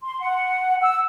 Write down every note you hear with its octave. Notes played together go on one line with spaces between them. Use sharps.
C6
F#5
E6